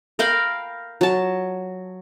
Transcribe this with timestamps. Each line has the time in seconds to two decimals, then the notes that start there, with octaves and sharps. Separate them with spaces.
0.19 A#4 F5 G5 B5
1.01 F#3 A5